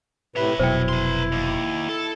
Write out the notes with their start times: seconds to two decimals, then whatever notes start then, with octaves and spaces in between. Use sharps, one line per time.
0.36 A2 C3 B4 C#5 E5
0.59 F1 B2 F#3 E4 C5 G5
0.89 B4 C6
1.32 D#2
1.89 A4